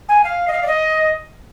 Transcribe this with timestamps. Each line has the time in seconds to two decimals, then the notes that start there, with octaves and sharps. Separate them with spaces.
0.08 G#5
0.24 F5
0.47 D#5
0.52 F5
0.63 D5
0.67 D#5